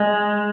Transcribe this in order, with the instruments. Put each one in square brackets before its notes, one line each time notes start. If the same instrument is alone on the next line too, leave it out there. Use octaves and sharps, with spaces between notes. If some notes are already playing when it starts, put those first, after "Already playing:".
Already playing: [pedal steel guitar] G#3